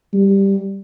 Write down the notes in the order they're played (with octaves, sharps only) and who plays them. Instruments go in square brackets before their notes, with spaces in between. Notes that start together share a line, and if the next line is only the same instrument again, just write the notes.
[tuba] G3